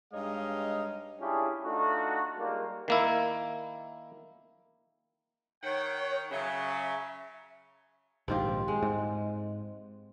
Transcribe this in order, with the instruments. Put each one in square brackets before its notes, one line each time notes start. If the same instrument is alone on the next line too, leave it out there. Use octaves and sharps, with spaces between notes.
[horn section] G2 G#3 D#4 C#5 D#5 F5
[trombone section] C#4 D4 E4 F4 G4 G#4
A3 D4 D#4 F4 F#4
G3 G#3 A#3 D#4 F4 G4
[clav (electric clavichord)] D#3 A#3 E4
[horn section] D#3 F#5 G5 [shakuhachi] C#5
[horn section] C#3 F#3 [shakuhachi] E5
[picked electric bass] A#1 G#2 D#3 [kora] C4 F4 G4
[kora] G#3
[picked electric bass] G#2